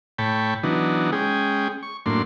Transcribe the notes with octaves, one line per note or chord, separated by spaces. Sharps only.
A2 C#5 G5 A5 B5
E3 F#3 B3 D4 D#4
G#3 C#4 G#4 G5
C#6
F#2 A2 A#3 D4 C6